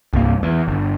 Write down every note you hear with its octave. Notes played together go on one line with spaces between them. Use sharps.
C2 G2 A#3
E2
G1